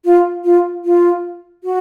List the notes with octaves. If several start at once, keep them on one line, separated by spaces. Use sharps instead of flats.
F4
F4
F4
F#4